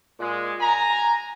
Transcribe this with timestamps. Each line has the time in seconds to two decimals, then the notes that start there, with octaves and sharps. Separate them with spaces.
0.20 A#2 G#3
0.60 G#5 A#5